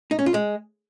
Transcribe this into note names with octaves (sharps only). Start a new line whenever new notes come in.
D#4
C#4
F4
G#3